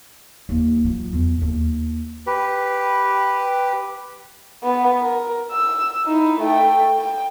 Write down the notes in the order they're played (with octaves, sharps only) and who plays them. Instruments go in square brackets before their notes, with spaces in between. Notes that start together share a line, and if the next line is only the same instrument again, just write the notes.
[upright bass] D#2
F#3 F4
E2
D#2
[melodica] G4 B4
[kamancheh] B3
A#4
E6
D#4 E4
A3 G5
G5